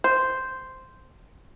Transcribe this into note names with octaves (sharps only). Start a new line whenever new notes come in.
C5